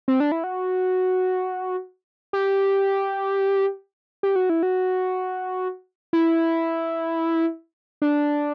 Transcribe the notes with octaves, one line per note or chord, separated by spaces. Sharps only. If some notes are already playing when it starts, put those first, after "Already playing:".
C4
D4
E4
F#4
G4
G4
F#4
E4
F#4
E4
D4